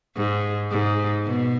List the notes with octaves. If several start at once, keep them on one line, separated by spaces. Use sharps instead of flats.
G#2
G#2
B2